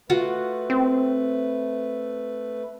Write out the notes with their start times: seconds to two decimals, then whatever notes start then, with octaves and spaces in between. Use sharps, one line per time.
0.10 A3 F4 F#4 B4 F#5
0.70 C4